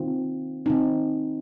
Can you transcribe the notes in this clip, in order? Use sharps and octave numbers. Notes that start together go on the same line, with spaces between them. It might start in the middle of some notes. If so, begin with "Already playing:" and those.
Already playing: D#3 C4 F4
D#3 C4 D#4